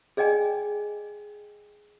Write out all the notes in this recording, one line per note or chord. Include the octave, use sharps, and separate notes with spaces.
G#4 D5 D#5 G5 G#5